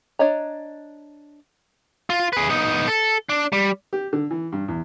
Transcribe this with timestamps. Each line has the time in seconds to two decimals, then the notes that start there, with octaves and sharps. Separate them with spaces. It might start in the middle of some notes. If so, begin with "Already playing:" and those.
0.19 D4 C#5 D#5 A#5
2.10 F4
2.33 G#4 B4
2.49 B3 D#4
2.88 A4
3.29 D4
3.52 G3
3.93 G4
4.13 D3
4.31 E3
4.52 G2
4.68 E2